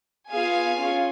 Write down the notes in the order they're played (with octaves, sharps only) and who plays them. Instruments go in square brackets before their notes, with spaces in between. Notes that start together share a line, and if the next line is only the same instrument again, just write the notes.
[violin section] B3 F4 G#4 F5 G#5
C#4 F4 G#4